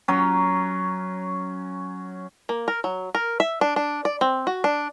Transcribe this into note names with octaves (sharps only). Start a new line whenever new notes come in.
F#3 C#4
A#3
A#4
F#3
A#4
E5
D4
D4
D5
C4
F#4
D4